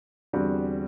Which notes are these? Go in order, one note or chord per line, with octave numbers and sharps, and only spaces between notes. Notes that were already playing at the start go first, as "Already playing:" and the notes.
E2 D3 G3 C4 F#4